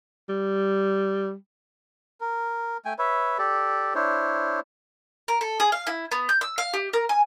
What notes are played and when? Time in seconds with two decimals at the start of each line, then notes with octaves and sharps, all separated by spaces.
0.29 G3
2.21 A#4
2.85 A3 G5 G#5
2.98 B4 C#5 E5
3.38 G4 A4 D5
3.95 D4 E4 C5 C#5
5.28 A#4
5.41 A4
5.60 G#4
5.72 F5
5.87 E4
6.11 B3
6.29 G6
6.41 E6
6.58 F5
6.74 G4
6.93 A#4
7.09 G#5